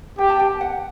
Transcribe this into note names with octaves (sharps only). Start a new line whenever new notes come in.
G4 G5
A5
G5
F#5